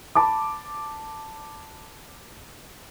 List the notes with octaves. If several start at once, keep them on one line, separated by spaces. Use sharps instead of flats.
A5 B5 D6